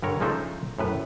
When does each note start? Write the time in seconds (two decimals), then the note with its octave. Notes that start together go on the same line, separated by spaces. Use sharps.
0.03 G2 D3 A#4 C#5
0.20 C#3 F3 G#3 A3 D#4 C5
0.79 F#2 A2 B4